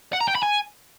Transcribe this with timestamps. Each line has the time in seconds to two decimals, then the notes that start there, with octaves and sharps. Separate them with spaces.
0.13 F#5
0.21 A#5
0.28 G5
0.35 B5
0.43 G#5